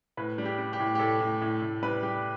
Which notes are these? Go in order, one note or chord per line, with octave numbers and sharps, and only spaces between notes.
A2 B4
G3
G4
G3
G4
A2
G4
A2 A4
A2
A2
A2
G3 B4
G3 G4